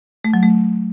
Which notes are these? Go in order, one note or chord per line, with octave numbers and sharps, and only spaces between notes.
A3
F#3
A3